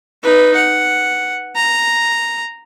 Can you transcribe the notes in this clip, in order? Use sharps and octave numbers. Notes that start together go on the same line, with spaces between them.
D#4 B4
F#5
A#5